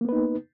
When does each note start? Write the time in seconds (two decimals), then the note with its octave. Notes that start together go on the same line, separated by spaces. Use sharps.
0.01 A#3
0.05 B3
0.09 B4
0.13 D#4